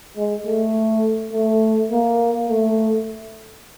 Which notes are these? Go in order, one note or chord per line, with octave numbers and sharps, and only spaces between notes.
G#3
A3
A3
A#3
A3